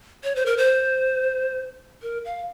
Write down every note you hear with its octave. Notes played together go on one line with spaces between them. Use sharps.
C#5
C5
A#4
C5
A#4
F5